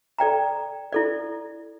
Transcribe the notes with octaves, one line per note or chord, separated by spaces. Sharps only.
A4 D5 G5 A#5
E4 A4 D5